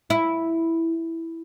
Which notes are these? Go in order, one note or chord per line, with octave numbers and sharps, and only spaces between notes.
E4